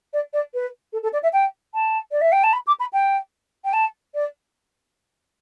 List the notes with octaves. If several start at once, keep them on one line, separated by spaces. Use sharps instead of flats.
D5
D5
B4
A4
A4
D5
E5
G5
A5
D5
E5
G5
A5
B5
D6
B5
G5
G5
A5
D5